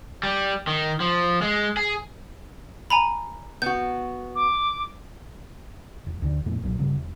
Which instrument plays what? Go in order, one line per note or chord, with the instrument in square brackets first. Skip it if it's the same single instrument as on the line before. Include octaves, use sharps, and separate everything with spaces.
[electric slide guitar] G3
D#3
F3
G#3
G#4
[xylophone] G#5 A#5 B5
[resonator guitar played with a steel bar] B3 F#4 [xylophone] G6
[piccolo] D6
[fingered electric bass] E1
D2 D3 D#3 D4
F2 A#2 A3
B1 A#2 C#3 F#3
G1 C#3 G3
E1